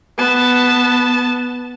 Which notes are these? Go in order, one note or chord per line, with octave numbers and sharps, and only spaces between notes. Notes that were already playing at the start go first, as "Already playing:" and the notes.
B3 A5